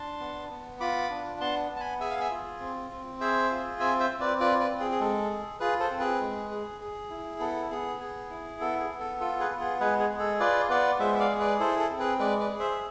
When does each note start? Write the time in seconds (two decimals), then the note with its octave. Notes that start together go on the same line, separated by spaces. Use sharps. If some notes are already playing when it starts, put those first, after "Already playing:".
Already playing: D4 A5 C6
0.20 B3
0.51 B3
0.80 F4 B5 D6
1.10 D4
1.40 B3 A5 C6
1.71 B3
1.76 A5
1.80 G#5 B5
2.00 G#4 E5 G#5
2.10 F5
2.20 E5 G#5
2.30 F4
2.60 C4
2.91 C4
3.21 G#4 C5 E5
3.51 F4
3.80 C4 E5 G#5
4.00 C5 E5
4.10 C4
4.20 B4 D5
4.40 F4 B4 D5
4.60 B4 D5
4.70 C4
4.80 G#4
4.91 G#4
5.00 G#3 A4
5.30 G#4
5.60 F4 G#4 B4
5.80 A4 C5
5.90 C4
6.00 G#4 B4
6.21 G#3
6.51 G#4
6.81 G#4
7.10 E4
7.40 B3 A4
7.71 B3 G#4
8.00 G#4
8.30 E4
8.61 B3 A4
8.80 G#4
8.90 B3
8.99 A4
9.21 F4 A4
9.39 G#4 B4
9.50 B3
9.60 G#4
9.80 G#3 G#4 B4
10.00 G#4
10.10 G#4
10.19 A4
10.40 F4 B4 D5
10.70 B3 B4 D5
10.99 G#3 C5 E5
11.15 E5
11.20 D5 F5
11.30 G#4
11.40 B4 D5
11.60 E4 A4 C5
11.79 A4
11.90 C4
11.99 G#4 B4
12.19 G#3 B4 D5
12.40 B4 D5
12.50 G#4
12.60 C5 E5
12.71 E5